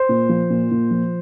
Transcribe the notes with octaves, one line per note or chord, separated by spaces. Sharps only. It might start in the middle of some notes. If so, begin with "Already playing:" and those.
Already playing: C5
A#2
F3
A#2
A#2
F3